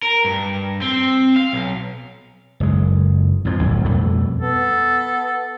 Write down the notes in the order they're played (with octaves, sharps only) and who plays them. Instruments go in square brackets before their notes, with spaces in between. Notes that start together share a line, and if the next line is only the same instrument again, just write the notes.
[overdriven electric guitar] A#4
G2
C4
F5
B1
[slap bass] F#1 G#3
F2 G#2 F3
D1 B1
F2 B2 G3 A3
[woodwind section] B3 A4